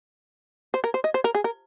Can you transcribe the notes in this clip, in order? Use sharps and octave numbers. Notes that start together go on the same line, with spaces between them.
C5
A#4
C5
D#5
C5
A#4
G#4
A#4